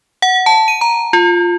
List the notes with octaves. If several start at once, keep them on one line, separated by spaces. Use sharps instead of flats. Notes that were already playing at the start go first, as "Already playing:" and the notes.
F#5
A5
D#7
A#5
F4